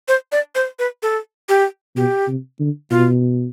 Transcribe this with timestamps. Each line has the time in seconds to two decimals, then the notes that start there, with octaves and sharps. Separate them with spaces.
0.08 C5
0.32 D5
0.55 C5
0.79 B4
1.03 A4
1.49 G4
1.96 B2 G4
2.28 C3
2.60 D3
2.91 B2 F4